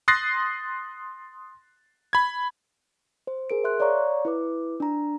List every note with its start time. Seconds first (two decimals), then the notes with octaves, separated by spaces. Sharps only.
0.08 C6 D#6 F#6 A6 A#6 C7
2.13 B5 G#6
3.27 C5
3.50 G#4 A#4 D7
3.64 E5 C6 F#6
3.80 C#5 D5 F5 A#5 C#6
4.25 E4 B4 D6
4.80 D4 A#5